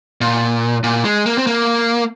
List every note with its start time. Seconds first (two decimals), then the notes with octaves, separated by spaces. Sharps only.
0.21 A#2
0.84 A#2
1.05 G#3
1.26 A#3
1.38 C4
1.47 A#3